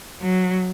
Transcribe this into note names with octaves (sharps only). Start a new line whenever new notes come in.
F#3